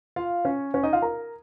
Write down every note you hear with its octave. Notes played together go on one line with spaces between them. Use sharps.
F4 F5
C#4 C#5
C#4 C#5
D#4 D#5
F4 F5
A#4 A#5